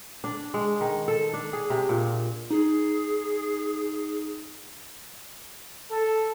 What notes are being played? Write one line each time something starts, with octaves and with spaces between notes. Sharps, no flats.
D4
G#3
D#3
A4
D4
G#4
C3
A#2
D#4 G#4
A4